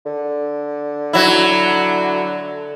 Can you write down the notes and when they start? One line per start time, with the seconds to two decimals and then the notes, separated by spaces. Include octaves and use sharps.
0.05 D3
1.13 F#3 E4